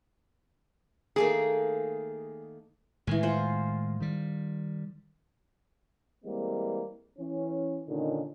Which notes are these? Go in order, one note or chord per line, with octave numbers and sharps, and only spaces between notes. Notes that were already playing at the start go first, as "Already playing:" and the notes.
D#3 A3 A#3 G#4
A2 D#3 E3 G#3 G#5
F4 C5 F#5
D#3 G3
E3 G3 G#3 A#3 C4
E3 C#4
A#2 D3 D#3 C#4 D#4